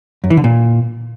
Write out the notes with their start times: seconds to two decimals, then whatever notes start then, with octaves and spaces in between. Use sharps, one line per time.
0.24 F#2
0.30 E3
0.37 D3
0.44 A#2